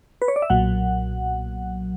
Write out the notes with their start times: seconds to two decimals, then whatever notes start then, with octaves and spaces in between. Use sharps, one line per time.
0.22 B4
0.28 C#5
0.36 D5
0.42 E5
0.50 B1 A#2 F#3 F#5